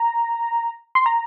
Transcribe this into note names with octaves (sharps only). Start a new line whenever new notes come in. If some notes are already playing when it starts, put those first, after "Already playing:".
Already playing: A#5
C6
A#5